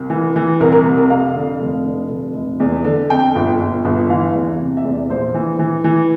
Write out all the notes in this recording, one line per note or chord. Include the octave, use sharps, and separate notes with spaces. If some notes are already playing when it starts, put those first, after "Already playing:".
Already playing: C2
E3
E3
C2 A#4
A#4
C3
A#4
F2 F5
D3
F1
D3
F1
F1
E2
D3
F2 G5
G1
G1
G1
E3 F5
E2
C3
E5
E2
D5
A#1 C5
E3
E3
E3